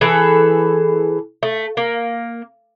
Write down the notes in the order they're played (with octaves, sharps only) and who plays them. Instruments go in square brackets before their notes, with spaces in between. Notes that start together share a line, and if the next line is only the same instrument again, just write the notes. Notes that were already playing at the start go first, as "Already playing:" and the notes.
[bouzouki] E3 G#4 A4
A3
A#3